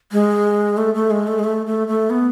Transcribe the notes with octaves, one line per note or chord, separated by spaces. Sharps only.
G#3
A3
A3
G#3
A3
G#3
A3
A3
A3
B3